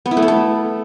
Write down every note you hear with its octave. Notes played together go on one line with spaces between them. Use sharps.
B3
E4
A3
B3
A4